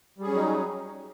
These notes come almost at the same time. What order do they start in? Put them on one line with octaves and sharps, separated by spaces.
G3 G#4 C#4 F#3 D#4